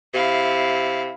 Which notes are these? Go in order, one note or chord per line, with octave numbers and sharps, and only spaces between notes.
C3 E4 F5